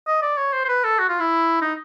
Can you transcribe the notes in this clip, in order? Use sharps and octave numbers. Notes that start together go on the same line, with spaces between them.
D#5
D5
C#5
C5
C5
B4
A4
F#4
F4
E4
D#4